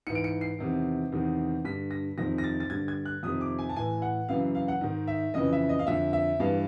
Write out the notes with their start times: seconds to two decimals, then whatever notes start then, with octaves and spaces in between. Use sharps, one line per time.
0.07 G#2 E3 C#7
0.15 D7
0.24 C#7
0.41 C7
0.59 E2 C3 D#3
1.12 E2 C3 D#3
1.64 G2 D3 B6
1.91 A#6
2.18 F2 C3 D#3 A#6
2.38 A#6
2.44 A6
2.60 A6
2.70 G2 D3 G#6
2.88 G#6
3.05 F#6
3.23 F2 C3 D#3 D#6
3.41 D6
3.59 G#5
3.69 A5
3.76 A2 E3 G#5
4.02 F#5
4.29 F#2 C#3 E3 F5
4.55 F5
4.68 F#5
4.81 G#2 D#3
5.08 E5
5.34 F2 C#3 E3 D#5
5.53 E5
5.69 D#5
5.79 F5
5.87 F2 D3 E5
6.13 E5
6.40 G2 E3 F5